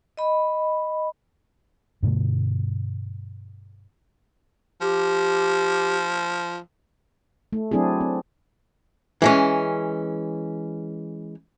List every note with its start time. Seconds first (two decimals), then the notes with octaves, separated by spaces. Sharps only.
0.17 D#5 B5
2.03 G2 B2 D3 A3
4.81 F3 G4
7.53 A3
7.71 F#3 C4 D4 E4 G#4
8.01 C4
9.22 E3 G#3 C#4